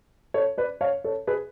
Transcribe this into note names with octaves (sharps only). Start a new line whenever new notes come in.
A4 C#5
B4 D5
C#5 F5
A4 C#5
G#4 B4